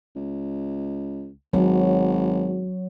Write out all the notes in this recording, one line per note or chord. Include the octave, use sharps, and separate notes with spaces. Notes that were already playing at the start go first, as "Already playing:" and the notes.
C#2
G#1 F#3